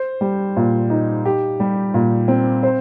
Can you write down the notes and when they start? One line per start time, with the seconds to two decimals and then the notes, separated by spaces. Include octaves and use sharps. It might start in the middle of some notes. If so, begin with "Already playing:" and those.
Already playing: C5
0.21 G3
0.56 A#2
0.90 D#4
1.25 G4
1.60 G3
1.94 A#2
2.28 C4
2.63 C5